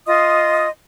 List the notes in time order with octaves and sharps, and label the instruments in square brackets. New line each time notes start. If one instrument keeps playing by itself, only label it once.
[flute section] F4 D#5 C6 D#6